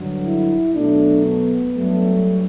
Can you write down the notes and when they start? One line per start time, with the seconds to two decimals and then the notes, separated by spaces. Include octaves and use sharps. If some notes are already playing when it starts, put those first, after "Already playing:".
Already playing: G2 D3 F#3
0.24 E4
0.74 B2 F#3 A3 D4
1.24 B3
1.73 G2 F#3 A3